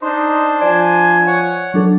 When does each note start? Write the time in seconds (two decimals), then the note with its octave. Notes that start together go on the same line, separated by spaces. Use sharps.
0.02 D4 D#4 C5 C6
0.61 F3 D5 G#5
1.26 C#5 F#5
1.74 F#3 D4 A4